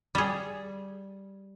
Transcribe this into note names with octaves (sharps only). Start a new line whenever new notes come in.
G3 G#4